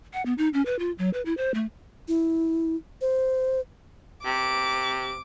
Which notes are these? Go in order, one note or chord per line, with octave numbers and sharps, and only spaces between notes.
F#5
B3
D#4
C#4
B4
F4
F#3
B4
E4
C5
A3
E4
C5
C3 D6